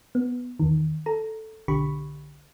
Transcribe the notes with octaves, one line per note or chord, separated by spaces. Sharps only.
B3
E2 D#3
A4 A#5
B1 D3 G4 B5 C#6